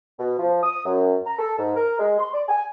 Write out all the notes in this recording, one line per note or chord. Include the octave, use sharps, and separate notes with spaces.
B2
F3
D#6
F#2
A#5
A4
G#2
A#4
G#3
C6
D5
G#5